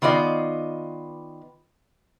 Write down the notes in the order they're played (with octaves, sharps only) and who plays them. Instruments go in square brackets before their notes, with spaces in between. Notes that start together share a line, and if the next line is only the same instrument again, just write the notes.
[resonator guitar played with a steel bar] D#3 B3 F4 D5 D#5